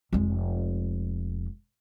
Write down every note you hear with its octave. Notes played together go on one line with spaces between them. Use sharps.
F1 G#3